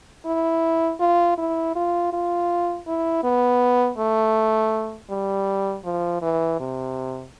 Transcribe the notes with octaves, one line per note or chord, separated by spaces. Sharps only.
E4
F4
E4
F4
F4
E4
B3
A3
G3
F3
E3
C3